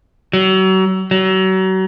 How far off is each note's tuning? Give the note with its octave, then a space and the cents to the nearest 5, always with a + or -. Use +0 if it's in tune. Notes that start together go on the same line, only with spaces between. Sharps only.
F#3 +35
F#3 +35